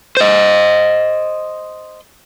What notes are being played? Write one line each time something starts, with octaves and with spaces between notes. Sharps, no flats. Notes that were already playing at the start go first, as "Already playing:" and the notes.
C5 D#5